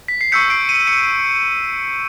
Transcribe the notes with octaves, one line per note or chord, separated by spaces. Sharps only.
B6
C7
C#6 E6 G6 B6 C#7
C7 D7
C#7 D#7
C#7 D#7